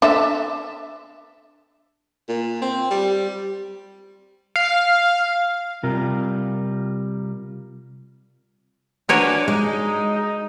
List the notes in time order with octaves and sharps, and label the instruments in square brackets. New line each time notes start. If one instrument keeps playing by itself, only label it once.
[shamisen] D4 A4 E5
[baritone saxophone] A#2
C4
G3
[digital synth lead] F5
[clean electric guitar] C3 G3 F4 A#4
[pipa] D4 F#4 B4 [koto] A#4 C#5 G#5 [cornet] D5
[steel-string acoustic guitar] G#3 [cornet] D#4
[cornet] D#4